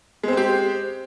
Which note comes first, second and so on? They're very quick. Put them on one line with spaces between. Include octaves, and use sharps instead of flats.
G#3 C4 C5 G4